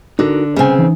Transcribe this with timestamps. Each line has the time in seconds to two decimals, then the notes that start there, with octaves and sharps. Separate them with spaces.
0.19 D3 D#4 F#4 A#4
0.56 C2 C#3 C4 G#5
0.79 E3 D#4